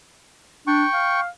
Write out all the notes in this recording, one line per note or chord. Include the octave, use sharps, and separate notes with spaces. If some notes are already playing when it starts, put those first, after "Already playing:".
D4 G5 C#6
F5